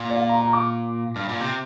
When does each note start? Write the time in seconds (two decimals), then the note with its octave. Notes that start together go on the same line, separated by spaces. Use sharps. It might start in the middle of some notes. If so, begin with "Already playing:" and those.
Already playing: A#2
0.10 D5
0.16 F5
0.29 A#5
0.42 A#5
0.53 D6
1.16 G2 F6
1.29 A#2
1.40 C3 G6